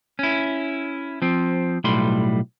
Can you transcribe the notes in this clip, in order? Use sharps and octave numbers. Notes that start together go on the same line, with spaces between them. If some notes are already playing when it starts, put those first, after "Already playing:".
C#4 E4
F3 C4
B1 A2 G3 B5 C6